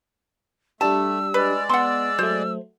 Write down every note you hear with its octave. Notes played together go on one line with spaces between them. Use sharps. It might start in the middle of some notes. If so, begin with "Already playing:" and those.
G3 A3 D4 G4 A5 E6
G#3 B4 D5
B3 F#5 C6 E6
F#3 A3 C5